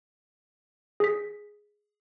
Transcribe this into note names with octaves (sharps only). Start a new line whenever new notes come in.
G#4 B6